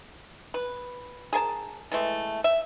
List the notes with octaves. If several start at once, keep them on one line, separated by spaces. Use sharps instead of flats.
B4
G#4 A#4 G#5 A5
E3 G#3 A3
E5